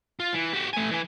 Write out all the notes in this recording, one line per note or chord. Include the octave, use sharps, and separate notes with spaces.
F4
E3
F#4 G4
A3 G#5
E3 G#5